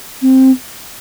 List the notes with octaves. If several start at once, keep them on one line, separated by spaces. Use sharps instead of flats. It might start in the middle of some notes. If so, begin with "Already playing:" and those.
C4